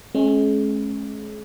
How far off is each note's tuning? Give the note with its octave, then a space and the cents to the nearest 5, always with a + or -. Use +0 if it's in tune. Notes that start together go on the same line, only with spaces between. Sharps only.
G#3 +35 C#4 -20